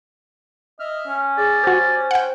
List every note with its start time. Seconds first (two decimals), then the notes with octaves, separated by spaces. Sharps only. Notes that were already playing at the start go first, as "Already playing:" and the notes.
0.80 D#5 E5 F6
1.07 C#4
1.37 G#4 D5
1.64 F#4 G4 C5
2.11 F#5 G5